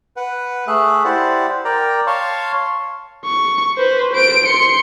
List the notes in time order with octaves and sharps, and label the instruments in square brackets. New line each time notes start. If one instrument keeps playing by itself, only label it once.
[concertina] B4 F#5
A3 G#4 E5 F#6
E4 G4 C5 D5 F#5
A#4 D5 G5 A#5
C#5 F5 A5 C6 C#6
[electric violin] C#6
B4 C5
C5 D7
C6 C#7